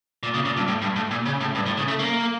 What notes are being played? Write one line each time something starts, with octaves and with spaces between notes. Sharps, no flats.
A#2
C#3
A#2
G2
A2
G2
A2
A#2
C#3
A2
G2
A2
C#3
A3
A#3